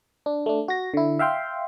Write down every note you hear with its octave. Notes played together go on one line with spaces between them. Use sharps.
D4
A3 D4
F#4 A#6
D3 E4
E5 F5 G5 C6